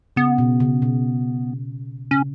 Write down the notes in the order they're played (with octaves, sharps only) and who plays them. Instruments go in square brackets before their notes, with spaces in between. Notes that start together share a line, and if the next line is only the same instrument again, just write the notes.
[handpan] C#3 [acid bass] B3
[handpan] B2
C#3
B2
[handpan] C#3 [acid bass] C#4